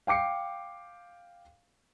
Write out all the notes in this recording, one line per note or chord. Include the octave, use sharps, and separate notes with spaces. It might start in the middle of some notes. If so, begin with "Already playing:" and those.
F5 G5 D6 C7 C#7